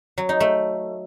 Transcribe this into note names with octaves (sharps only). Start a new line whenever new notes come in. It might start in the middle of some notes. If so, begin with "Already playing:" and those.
F#3
D#4
A3